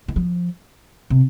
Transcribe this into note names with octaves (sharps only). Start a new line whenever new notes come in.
D#3
F3
C3